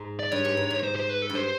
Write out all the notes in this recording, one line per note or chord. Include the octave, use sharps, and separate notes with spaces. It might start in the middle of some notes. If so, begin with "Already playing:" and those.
Already playing: G#2
D5
G2 C#5
G#2
G2
G#2
C5
C5
B4
A4
G2
C5